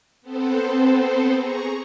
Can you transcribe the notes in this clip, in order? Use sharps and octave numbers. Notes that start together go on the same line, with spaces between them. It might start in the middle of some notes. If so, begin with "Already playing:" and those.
B3 C4 A4 C5
G#4 A#5 C#6